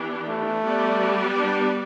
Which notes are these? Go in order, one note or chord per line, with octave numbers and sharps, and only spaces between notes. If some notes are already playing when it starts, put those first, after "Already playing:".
Already playing: E3 B3 D4 G4
A3
G3 B3 G4 D5
D4